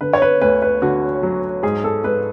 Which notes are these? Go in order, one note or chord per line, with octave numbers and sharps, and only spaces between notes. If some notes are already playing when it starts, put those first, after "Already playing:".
D3 B4
C#5
B4
D2 B4
B4
D3 F#4
F#3
G#2 G#4
A4
G#2 B4